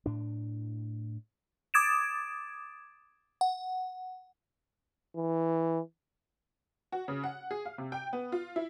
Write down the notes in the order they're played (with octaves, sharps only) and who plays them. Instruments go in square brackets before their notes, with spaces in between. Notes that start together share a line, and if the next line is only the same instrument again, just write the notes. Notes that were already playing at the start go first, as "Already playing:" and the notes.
[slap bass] A2 D4
[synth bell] D6 D#6 G#6 A6 D7 E7
F#5
[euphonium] E3
[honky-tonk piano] F#4
C#3
F#5
G#4
F5
C3
G5
B3
F4
E4